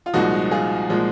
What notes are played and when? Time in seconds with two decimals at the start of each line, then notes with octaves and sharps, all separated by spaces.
0.06 F4
0.13 C2 A#2 F3 G#3 D#4 F#4
0.51 F4 G#4
0.89 A#2 F3 G#3